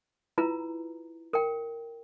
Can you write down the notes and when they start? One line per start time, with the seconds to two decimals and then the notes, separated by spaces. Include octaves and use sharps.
0.38 E4 F4 B4 A#5
1.33 A#4 G5